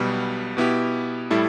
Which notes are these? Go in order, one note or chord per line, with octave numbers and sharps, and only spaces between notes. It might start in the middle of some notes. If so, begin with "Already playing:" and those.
Already playing: B1 B2 G3 B3
B2 B3 E4 G4
A2 G3 E4 A4